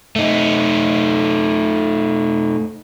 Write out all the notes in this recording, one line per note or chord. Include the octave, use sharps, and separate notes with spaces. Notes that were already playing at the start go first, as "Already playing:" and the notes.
A3 D#4